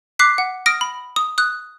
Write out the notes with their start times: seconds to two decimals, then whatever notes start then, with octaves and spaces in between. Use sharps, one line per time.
0.19 D6 F#6 B6 C7
0.38 F#5
0.66 D#6 F6 A#6 D7
0.81 B5
1.16 D#6
1.38 D#6 F#6